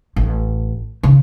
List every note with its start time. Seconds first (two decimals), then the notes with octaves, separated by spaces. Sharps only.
0.16 A1
1.03 C#3